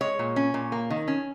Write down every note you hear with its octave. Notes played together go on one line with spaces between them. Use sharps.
G#3 C#5
A#2
C#4
A#2
A#3
D#3
C#4